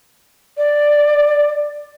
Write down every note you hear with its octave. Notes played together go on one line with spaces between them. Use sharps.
D5